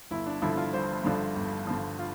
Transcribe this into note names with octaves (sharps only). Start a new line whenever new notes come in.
G1 E4
D4
G2 D3 F3 E4
F4
G1 C5
G2 D3 F3
G1
G2 D3 F3
F4